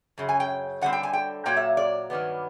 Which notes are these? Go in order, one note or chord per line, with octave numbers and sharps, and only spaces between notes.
F#2 C#3
G#5
G5
D3 G3 C4 F#5
G5
G#5
G5
A#2 F#3 A#3 G5
E5
D5
G2 D#3 F#3 B3